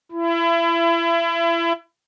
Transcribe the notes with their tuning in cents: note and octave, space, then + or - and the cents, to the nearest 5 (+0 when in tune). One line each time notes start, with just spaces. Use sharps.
E4 +30